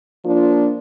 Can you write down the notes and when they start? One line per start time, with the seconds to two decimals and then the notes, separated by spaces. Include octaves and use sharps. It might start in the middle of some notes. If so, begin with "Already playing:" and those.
0.25 F3 A#3 D4 F4